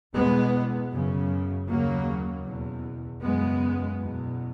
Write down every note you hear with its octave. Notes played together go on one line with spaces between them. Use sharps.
E2 B2 G#3 B3
F#2 C#3
D#2 C#3 F#3 A#3
E2 B2
F#2 C#3 G#3 B3
E2 B2